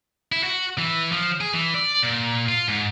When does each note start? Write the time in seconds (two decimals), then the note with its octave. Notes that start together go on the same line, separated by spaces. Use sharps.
0.32 E4
0.43 F#4
0.78 E3
1.12 F3
1.41 G#4
1.54 E3
1.74 D5
2.03 A#2
2.49 F4
2.68 G#2